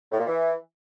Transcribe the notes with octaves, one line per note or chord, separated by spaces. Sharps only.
A2
A#2
E3